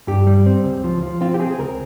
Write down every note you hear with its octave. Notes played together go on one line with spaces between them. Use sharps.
G2 G4
G3
C4
C#2
F3
F3
C4 F4
G4
C4 G#4
G#4
C#2 A#4